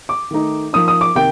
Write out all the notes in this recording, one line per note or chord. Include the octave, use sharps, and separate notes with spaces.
D6
D#3 A3 D#4
F3 A#3 D#4 D#6
D#6
D6
C3 D#3 A#3 G5